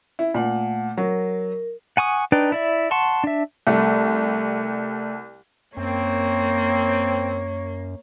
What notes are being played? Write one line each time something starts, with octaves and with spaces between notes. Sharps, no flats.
E4
A#2 A3 F#5
F#3 A#4
F#5 G#5 C#6 D#6
D4 D#4 B4 D5 G5
E4 D5 E5
F#5 A5 C6 C#6
D4 E5
C2 A3
F#2 A#3 C4 C#5